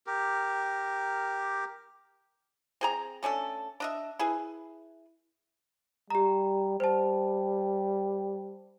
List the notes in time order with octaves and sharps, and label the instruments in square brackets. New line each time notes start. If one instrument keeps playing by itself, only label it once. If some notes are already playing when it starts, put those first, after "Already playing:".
[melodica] G4 A#4
[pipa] C4 G#4 A#5
A3 C#4 D4 A4
D4 D#5 E5
E4 G#4 B4
[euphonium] G3 [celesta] G4 A#5
[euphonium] G3 [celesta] C5 A5